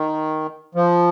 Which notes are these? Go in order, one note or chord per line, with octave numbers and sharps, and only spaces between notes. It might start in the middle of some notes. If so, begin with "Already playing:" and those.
Already playing: D#3
F3